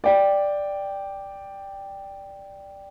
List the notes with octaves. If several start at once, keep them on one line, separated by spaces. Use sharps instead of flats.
D5 G5